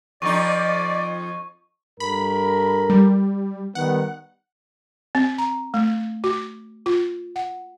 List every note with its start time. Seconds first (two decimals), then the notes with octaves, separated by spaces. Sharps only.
0.22 F2 F3 D#4 D5 C#6
2.00 G2 A4 A#4 B5
2.90 G3
3.75 D#3 G3 B3 F#5
5.15 C4
5.38 A#5
5.74 A3
6.24 F#4
6.86 F4
7.36 F#5